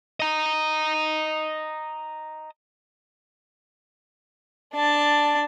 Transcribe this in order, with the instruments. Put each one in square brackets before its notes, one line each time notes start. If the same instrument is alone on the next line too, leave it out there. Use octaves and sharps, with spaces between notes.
[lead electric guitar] D#5 A#5
[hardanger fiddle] D4 A5